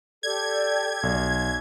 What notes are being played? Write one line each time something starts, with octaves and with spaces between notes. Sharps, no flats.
G4 A4 D5 G#6
B1